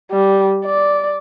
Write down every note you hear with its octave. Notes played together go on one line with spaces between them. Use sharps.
G3
D5